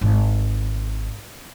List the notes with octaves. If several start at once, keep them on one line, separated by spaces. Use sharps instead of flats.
G#1